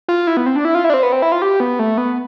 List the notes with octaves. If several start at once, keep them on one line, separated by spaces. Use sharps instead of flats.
F4
E4
B3
C4
D4
E4
F4
E4
D4
C4
B3
C4
E4
F4
G4
B3
A3
B3